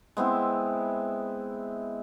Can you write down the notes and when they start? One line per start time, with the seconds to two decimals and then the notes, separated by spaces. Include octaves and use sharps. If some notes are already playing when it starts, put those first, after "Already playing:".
0.17 G#3 B3 C4 E4